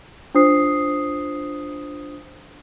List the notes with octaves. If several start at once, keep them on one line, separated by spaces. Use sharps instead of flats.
D4 F4 C5 D#6 C7